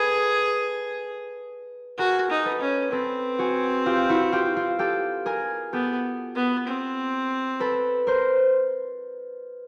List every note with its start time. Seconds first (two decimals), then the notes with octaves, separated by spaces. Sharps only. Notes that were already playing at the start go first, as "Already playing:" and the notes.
Already playing: G#4 A4 B4
1.98 F#4 G#4 A#4
2.30 D#4
2.45 A4 B4
2.61 C#4
2.92 C4 A4 B4
3.39 F#4 G#4
3.86 F4 G4
4.09 E4 F#4
4.32 F4 G4
4.56 F4
4.79 G4 A4
5.26 G#4 A#4
5.73 B3 G4 A4
6.35 B3
6.67 C4
7.60 A4 B4
8.07 A#4 C5